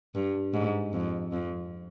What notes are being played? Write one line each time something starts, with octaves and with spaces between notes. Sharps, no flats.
G2
G#2
F2
F2